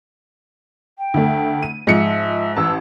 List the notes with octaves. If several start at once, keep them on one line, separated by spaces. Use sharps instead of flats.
G5
D2 A3
D#7
G#2 F3 G#3 E5 C#7
A1 A5 E6